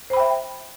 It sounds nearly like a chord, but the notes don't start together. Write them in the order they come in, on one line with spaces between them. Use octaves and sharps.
C5 B5 G5 E5